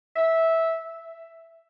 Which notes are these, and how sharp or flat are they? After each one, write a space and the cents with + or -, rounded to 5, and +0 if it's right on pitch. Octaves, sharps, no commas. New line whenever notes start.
E5 -10
E5 +5